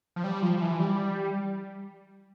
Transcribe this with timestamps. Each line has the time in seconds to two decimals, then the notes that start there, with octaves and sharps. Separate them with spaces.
0.16 F3
0.24 G3
0.42 F3
0.57 F3
0.61 E3
0.80 G3